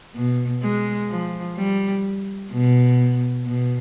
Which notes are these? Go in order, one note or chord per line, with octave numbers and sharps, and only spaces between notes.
B2
G#3
F3
G3
B2
B2